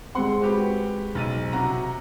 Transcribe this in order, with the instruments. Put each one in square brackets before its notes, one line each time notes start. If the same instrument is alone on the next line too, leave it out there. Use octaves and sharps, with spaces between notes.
[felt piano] G#3 C4 [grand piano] F#5 C6
[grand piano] F#4 G4 B4
B1 A6 D#7
C3 F#4 A#5